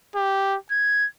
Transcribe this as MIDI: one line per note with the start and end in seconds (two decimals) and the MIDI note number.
0.16 0.57 67
0.71 1.07 92